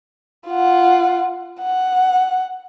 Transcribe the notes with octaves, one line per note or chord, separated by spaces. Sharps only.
F4 F#5
F#5